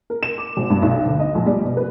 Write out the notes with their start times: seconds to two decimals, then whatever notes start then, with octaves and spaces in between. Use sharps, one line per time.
0.10 A#4
0.23 E7
0.38 D6
0.57 G#1
0.70 G2
0.82 B1
1.06 D2
1.20 D#5
1.35 A#1
1.46 G3
1.64 B2
1.77 B4